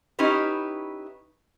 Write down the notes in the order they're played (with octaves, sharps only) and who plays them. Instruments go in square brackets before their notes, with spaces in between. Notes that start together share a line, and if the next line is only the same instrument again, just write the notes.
[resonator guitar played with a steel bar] C#4 D#4 E4 G4 B4